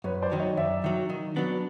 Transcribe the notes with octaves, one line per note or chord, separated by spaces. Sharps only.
F#2 B4 C#5
C5 D5
D#3 F#3
C#5 D#5
F#2 D5 E5
D#3 F#3
D#3
F#3 B3 D4